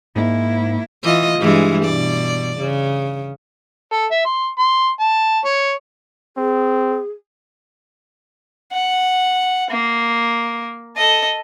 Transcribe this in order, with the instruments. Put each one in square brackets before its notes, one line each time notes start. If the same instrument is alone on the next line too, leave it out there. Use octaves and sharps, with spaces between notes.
[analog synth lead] G#2 [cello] A#3 E4
[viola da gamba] E3 F4 D#5
G2 E3 G#3
B2 D5
C#3
[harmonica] A4
E5
C6
C6
A5
C#5
[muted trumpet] C4 [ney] G#4
[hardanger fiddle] F#5
A#3
A4 D#5